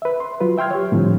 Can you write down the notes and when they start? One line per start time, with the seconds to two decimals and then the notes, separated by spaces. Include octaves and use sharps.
0.02 B4 E5
0.20 C6
0.41 F#3 F4 B4
0.58 E5 G5 C6 F6 G#6
0.71 G4 C#5
0.92 A2 D3 F3 G3 C4